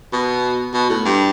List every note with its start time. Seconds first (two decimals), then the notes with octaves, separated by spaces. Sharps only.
0.13 B2
0.73 B2
0.90 A2
1.05 G2